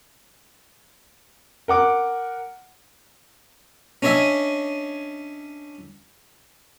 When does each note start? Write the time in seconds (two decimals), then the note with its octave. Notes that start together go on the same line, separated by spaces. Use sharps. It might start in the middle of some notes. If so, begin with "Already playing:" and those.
1.68 A#4 F#5 D6
4.02 C#4 D4 C#5 D#5 E5 G#5